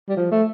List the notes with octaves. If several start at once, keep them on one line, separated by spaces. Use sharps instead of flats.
G3
F3
A3